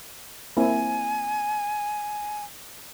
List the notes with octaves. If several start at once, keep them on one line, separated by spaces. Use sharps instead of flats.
A#3 C4 E4 G#5